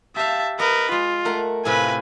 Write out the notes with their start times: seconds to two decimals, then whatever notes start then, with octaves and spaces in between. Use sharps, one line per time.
0.16 G4 E5 F5 A5
0.59 A#4 B4 D#5
0.91 G#3 F4
1.25 A3 A#4 F#5
1.65 A2 C3 F4 B4 G#5